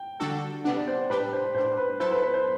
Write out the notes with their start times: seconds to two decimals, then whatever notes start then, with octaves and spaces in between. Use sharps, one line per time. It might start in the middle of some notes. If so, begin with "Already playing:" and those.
Already playing: G5
0.20 D3 G3 D4 F#4 A4
0.64 C3 G3 B3 D4 F#5
0.76 D5
0.87 C5
1.10 A2 G3 D4 G4 B4
1.33 C5
1.54 A2 G3 D4 C5
1.78 B4
2.00 F#3 B3 E4 A4 C5
2.11 B4
2.23 B4
2.34 C5